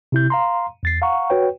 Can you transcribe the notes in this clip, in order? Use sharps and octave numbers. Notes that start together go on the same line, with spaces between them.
C3 E4 G6
F5 A#5 C6
E2 A6 C7
F5 F#5 A#5 C#6
F#4 B4 C#5 G5